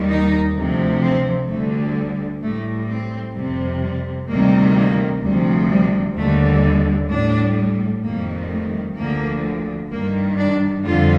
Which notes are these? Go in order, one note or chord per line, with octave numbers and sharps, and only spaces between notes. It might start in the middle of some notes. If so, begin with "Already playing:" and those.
Already playing: D#2 D#3 G3
D#4
D2 C3 F3
C4
D2 D3 G3 A3
A2 G3 A3
C4
F2 C3 G3
G3
D2 C3 D#3 G3 A#3
A#3
D2 C3 F3 G3
G3
D#2 D3 G3 A3
A2 G3 D4
F2 D#3 G3 A#3
A3
D2 D3 F3 A#3
G2 D#3 G3 A#3
D4
F2 D3 G3 F4